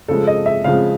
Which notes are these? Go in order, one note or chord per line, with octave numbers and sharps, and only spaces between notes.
C#3 F3 G#3 A4
D#5
E5
C#3 F3 G#3 F5